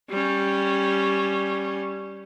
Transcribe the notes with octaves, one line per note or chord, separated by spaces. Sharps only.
G3 C#4